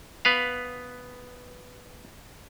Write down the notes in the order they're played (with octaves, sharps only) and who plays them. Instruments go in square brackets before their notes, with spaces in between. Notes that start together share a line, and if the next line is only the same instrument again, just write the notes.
[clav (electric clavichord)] B3 B4 F5